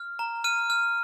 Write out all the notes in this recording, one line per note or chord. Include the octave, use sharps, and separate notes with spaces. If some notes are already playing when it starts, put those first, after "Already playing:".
Already playing: F6
A#5
F6 D#7
F6